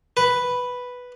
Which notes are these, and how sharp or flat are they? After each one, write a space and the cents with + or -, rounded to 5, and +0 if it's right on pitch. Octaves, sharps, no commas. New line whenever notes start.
B4 +0